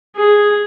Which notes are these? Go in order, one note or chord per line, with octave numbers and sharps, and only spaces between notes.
G#4